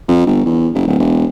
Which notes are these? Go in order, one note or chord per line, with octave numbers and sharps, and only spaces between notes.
F2
G1
E2
F#1
D1
E1